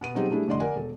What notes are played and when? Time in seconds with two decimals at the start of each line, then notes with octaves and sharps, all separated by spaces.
0.01 B2 B3 D#7
0.15 B2 F#3 C4 D#4 G4 G#4
0.30 G3 A3 D4 E4 G#4
0.48 F1 A2 D3 D5 D#5 C6
0.60 A#4 D5 F#5 G#5
0.76 E1 A4